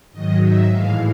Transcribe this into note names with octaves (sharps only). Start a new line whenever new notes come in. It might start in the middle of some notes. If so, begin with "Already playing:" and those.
G#2 D#3 F#3 D#5
E5
A2 E3 G#3 F5